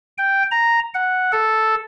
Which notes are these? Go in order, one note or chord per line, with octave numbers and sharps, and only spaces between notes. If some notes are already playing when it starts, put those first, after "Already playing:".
G5
A#5
F#5
A4